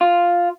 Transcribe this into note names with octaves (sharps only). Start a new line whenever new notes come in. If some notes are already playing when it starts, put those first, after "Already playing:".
F4